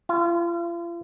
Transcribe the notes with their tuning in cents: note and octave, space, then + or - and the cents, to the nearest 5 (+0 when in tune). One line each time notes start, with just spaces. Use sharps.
F4 -40